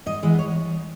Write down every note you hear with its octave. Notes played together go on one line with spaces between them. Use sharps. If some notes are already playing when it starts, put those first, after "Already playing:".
G#2 D#5
E3 G#3 B3
C#5